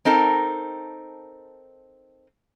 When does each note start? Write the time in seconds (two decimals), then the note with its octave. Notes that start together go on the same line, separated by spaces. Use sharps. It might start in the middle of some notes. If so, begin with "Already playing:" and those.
0.05 C4 D#4 A4 A#4